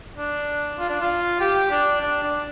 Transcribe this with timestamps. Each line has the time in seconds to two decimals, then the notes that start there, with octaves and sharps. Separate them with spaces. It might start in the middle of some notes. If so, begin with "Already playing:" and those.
0.17 D4
0.79 F4
0.89 D4
1.01 F4
1.40 G4
1.71 D4
2.01 D4
2.22 D4